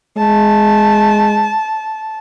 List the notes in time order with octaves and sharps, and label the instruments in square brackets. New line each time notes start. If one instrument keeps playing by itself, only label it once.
[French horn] G#3 [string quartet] A5